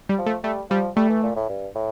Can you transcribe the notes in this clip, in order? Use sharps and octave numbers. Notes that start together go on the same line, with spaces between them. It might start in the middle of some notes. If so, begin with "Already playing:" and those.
G3
F3
A3
G3 A3
F3 G3
G3 A3
E3
A#2
A2
G2
A2